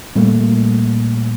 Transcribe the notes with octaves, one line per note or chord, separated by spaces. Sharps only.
A#2 G3 A3 A#3